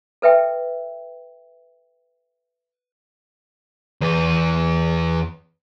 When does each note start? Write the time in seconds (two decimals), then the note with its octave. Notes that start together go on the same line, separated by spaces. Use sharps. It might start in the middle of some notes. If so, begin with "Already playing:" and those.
0.22 A4 B4 E5 G5
4.01 E2 B3